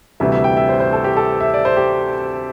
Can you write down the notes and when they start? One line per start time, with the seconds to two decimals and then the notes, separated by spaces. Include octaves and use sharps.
0.20 D2 C3 E3 G3 E5
0.32 E5
0.44 G5
0.57 E5
0.69 C5
0.80 C5
0.93 A4
1.04 G4
1.17 A4
1.40 E5
1.54 D5
1.65 C5
1.77 G4